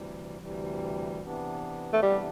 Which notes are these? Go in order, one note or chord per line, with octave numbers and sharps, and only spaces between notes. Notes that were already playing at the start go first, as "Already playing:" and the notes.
Already playing: D2 C3 E3 G3
D2 C3 E3 G3
C3 E3 B3 D4
A3
C3 E3 G3 B3 D4